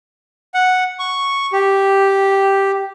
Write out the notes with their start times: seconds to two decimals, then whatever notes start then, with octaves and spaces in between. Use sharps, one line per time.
0.54 F#5
0.99 C#6
1.52 G4